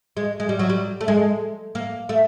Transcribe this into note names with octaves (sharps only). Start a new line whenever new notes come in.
G#3
G#3
G3
F#3
G3
A3
G#3
A#3
A3